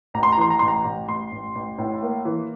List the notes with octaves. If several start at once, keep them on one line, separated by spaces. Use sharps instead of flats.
A1 A#5
C6
A#5
E3 C6
A#5
A1 C6
A#5
A1
A1 C6
A1
A1
A2
A#3
E3